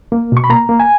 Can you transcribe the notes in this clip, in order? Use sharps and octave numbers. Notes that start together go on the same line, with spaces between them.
A#3
B2 C#6
B5
A#3 A#5
A#3
G#5